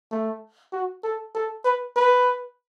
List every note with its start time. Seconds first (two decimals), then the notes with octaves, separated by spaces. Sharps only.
0.11 A3
0.72 F#4
1.03 A4
1.35 A4
1.65 B4
1.96 B4